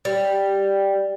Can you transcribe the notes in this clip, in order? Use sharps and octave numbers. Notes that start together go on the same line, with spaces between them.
G3